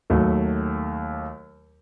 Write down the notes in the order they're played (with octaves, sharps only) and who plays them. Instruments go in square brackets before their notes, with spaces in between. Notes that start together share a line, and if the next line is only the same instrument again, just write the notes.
[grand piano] D#2 F#3 A3